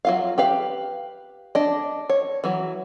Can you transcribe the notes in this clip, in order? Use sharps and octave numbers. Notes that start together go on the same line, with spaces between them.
F#3 F4 F5
G4 B4 F5
D4 D#5
C#5
E3 F#3